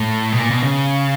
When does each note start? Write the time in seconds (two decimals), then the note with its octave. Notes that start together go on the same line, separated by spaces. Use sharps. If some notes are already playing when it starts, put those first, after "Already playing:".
Already playing: A2
0.32 B2
0.39 A#2
0.51 B2
0.62 C#3